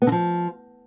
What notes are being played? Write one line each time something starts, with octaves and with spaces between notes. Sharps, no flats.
B3
D3
F3